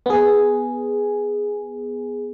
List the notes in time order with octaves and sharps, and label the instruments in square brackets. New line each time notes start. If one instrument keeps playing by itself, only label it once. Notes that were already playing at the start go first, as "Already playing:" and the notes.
[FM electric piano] B3 G#4